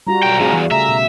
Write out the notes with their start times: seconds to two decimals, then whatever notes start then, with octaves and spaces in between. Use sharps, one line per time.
0.07 G3 F4 F#4 A#5
0.23 B1 G5
0.40 A2 C3 F#4 G#4 F5
0.52 E2
0.71 C#3 A3 E5 A#5
0.89 B2